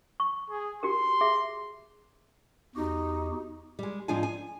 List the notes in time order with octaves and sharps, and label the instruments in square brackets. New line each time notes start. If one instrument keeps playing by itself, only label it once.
[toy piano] C#6
[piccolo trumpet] G#4
[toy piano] F#4 G4 A#4 [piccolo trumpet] C6
[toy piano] G#4 E5
[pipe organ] E2 F#4 G4 [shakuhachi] D#4
[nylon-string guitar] G3 G#3
G#2 F3 C4 D4 F4 G#5
G#5